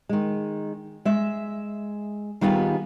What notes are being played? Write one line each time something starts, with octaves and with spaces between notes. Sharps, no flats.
D#3 G#3
G#3 E5
D#3 G3 B3 D#4 F4 G#4